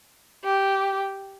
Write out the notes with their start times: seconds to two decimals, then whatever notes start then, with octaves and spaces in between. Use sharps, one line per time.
0.44 G4